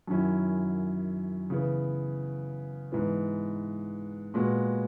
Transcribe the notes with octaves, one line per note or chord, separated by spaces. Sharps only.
F#2 D#3 F#3 C#4 E4
C#3 E3 B3
G#2 E3 B3
A#2 G#3 B3 F#4